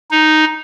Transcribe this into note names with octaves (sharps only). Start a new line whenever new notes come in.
D#4